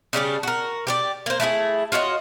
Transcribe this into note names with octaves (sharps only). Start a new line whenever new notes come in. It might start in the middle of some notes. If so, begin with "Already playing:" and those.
C#3 G3 C#4 D4
F#4 A#4
G4 B4 D5
A#3 C5
A3 E4 F4 G#4
F4 F#4 C#5 D#5